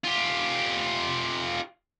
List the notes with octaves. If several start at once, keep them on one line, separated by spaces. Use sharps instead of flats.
F4 G4